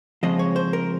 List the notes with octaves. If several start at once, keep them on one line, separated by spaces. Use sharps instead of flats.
C#3 F3 G#3 C4 D#5
C#5
C5
A#4